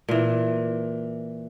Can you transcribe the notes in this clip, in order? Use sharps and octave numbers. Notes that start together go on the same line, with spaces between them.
A#2 E3